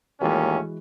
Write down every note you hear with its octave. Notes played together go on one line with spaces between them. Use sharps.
D#2 A#2 E3 G#3 A3 C#4 F#4